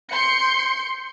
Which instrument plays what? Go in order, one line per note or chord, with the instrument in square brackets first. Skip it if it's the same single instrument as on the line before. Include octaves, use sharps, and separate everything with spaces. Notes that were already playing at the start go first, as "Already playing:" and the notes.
[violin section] C6 G6 C#7